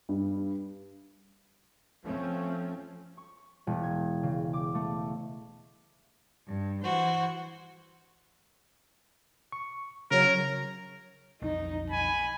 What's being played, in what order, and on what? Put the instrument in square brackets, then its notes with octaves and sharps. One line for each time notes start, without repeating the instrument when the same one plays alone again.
[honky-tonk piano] G2
[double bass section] F3 A3 C4 C#4
[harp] C#6
E1
G#6
C#3
D6
A3
[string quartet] G2
E3 F#4 C5
[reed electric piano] C#6
[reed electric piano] C#3 F#3 [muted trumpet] A#4 [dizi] C#5
[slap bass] B1 F2 F#3 [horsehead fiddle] D#4
[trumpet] G#5 [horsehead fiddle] B5